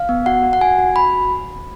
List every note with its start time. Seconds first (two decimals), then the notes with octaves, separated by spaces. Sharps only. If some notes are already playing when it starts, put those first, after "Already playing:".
Already playing: F5
0.09 B3
0.26 F#4 F#5
0.43 F#4
0.53 F#5
0.61 F#4 G#5
0.78 F#4
0.96 F#4 B5